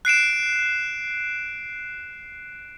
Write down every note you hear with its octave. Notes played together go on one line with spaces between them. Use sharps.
F#6 C7 D7 E7